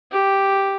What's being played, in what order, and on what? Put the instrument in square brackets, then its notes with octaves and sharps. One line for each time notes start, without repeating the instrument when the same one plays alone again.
[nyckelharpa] G4